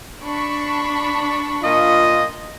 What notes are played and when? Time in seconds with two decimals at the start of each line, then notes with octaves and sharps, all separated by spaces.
0.22 D4 B5 C#6
1.63 A#2 F4 D#5